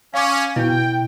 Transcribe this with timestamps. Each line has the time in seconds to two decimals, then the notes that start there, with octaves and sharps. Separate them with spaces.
0.14 C#4 F5 C#6 D6
0.56 B2 E4 G5